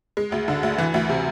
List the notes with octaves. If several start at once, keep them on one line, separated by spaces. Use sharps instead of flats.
G#3
D2
D3
D2
E3
D2
C3